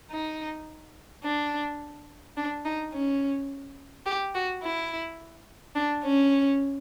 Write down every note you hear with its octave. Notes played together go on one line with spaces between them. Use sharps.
D#4
D4
D4
D#4
C#4
G4
F#4
E4
D4
C#4